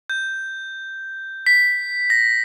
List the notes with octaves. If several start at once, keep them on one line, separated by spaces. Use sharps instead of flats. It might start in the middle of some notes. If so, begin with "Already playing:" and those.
G6
B6
A#6